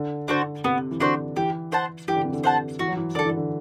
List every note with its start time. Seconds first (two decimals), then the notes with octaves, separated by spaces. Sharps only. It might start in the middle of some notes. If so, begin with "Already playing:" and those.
Already playing: D3
0.28 D3 D4 F#4 C5
0.64 C3 B3
0.91 E3
1.00 D3 D4 F#4 C5
1.36 E3 G4
1.72 C5 F#5 A5
2.08 E3 G4
2.16 D3
2.24 C3
2.33 D3
2.44 C5 F#5 A5
2.79 E3 F#4
2.88 F#3
2.97 E3
3.15 D3 A4 D5
3.25 E3
3.36 D3